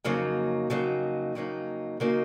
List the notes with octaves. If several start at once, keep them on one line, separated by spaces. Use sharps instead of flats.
F2 C#3 F#3 A#3 D#4
F2 C#3 F#3 A#3 D#4
F2 C#3 F#3 A#3 D#4
C#3 F#3 A#3 D#4